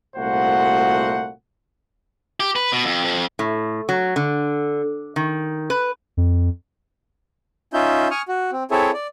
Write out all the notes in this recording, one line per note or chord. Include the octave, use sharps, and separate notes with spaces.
C2 A#2 A3 F#4 C5 F#5
G4
B4
B2
F2
F2
A2
F#3
D3
D#3
B4
F2
C#4 D#4 F4 E5 G6
G#5 C#6 D#6 F6
F#4
C4
C4 E4 G#4 A4 C#5 E5
D5